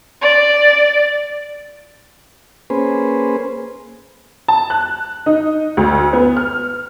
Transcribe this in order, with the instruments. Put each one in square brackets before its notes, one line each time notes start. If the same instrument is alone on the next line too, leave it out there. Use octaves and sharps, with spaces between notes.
[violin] D5
[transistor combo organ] A#3 C#4 G#4 B4 C5
[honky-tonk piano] A5
F#6
D#4
D2
B3
F6